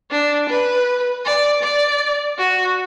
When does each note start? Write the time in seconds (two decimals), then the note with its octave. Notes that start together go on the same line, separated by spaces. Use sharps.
0.11 D4
0.49 B4
1.25 D5
1.63 D5
2.38 F#4